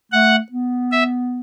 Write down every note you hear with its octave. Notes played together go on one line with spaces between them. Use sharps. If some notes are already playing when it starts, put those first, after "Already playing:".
A3 F#5
B3
E5